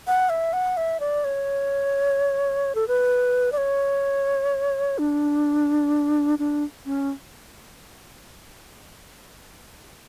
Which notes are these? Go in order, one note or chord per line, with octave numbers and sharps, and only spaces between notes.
F#5
E5
F#5
E5
D5
C#5
A4
B4
D5
C#5
D4
D4
C#4